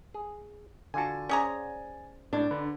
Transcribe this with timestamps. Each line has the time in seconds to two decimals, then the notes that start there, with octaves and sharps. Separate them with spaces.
0.14 G#4
0.94 D3 F4 F#4 G#5 A5
1.29 C#4 G#4 C5 D5 F#5 A#5
2.33 A2 D4
2.51 D3 B4